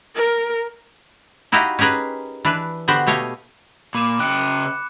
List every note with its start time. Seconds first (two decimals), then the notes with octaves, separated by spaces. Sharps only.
0.15 A#4
1.52 D#4 E4 F#4 G4 D#5 F5
1.79 C#4 G4 G#4 A#4 B4
2.45 E3 D4 B4
2.88 D3 B3 F#4 G4 C5
3.07 B2 A3 G4 C#5 D#5 F5
3.95 A#2 B5 D6 E7
4.20 C#3 G5 F#6 C#7